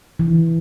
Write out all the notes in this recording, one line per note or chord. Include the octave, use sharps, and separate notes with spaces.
E3